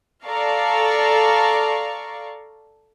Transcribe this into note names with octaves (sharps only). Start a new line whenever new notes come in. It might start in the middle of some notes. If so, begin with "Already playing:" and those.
A4 D5 F5 A#5 C#6